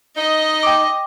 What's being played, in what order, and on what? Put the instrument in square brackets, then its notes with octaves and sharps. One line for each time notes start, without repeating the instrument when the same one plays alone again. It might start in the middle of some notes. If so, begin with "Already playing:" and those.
[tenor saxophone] D#4 [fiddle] D#5
[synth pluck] G5 D6